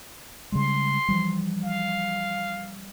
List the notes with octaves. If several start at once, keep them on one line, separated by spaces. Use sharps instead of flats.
C#3 G3 G#3 C6
E3 F3 G3
F5